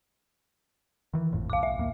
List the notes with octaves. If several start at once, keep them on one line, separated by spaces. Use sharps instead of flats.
D#3 E3
G#1 F2 A2
B1 A2 F5 D6
E5
D#2 G3 A#3